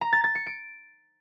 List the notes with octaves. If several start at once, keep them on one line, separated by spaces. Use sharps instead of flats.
A#5
A6
A6
C#7
D7